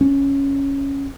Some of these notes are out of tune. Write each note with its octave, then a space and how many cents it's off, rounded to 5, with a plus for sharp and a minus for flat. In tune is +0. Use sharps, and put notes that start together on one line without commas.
C#4 +0